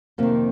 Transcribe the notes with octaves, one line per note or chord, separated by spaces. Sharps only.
F2 C3 D#3 A#3